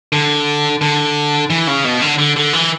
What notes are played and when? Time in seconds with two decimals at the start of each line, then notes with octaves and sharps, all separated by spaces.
0.12 D3
0.81 D3
1.50 E3
1.67 C#3
1.85 B2
2.02 D3
2.18 D3
2.36 D3
2.53 E3